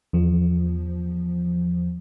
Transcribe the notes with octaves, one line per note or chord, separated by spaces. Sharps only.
E2 F3